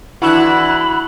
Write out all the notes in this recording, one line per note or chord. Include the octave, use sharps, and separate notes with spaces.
D3 E3 E4 F#4 B5 E6 F#6